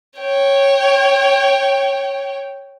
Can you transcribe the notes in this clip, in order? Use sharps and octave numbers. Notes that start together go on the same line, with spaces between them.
C#5 G5